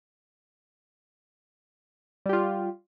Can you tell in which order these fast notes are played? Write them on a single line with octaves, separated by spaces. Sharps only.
G3 G4 F4